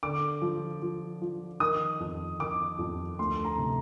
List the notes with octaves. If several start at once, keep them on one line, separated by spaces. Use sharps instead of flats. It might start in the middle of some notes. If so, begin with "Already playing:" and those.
D3 D6
F3
F3
F3
D#3 D#6
F2
D#3 D6
F2
D2 C6
A#5
C3